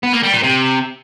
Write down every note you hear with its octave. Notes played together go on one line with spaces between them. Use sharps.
B3
A#3
G3
A#2
C3